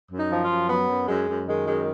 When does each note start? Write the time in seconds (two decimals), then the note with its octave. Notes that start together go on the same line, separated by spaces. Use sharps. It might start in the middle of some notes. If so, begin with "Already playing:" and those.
0.12 F#2
0.17 D#4
0.31 F3
0.43 F4
0.50 F#2
0.69 F#3 B3
0.89 F#2
1.08 F#2 G#3
1.28 F#2
1.47 D#3 G#3
1.66 F#2 G#3